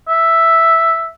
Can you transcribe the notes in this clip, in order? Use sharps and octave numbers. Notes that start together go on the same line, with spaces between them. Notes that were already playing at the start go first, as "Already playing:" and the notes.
E5